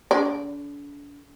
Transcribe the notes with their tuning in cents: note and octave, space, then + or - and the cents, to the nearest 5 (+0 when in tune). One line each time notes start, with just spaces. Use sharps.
D3 -40 D5 +0